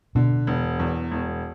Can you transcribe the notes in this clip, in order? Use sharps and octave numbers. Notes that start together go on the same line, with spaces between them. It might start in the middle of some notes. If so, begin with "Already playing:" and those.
B2 D3
E1
E2
E1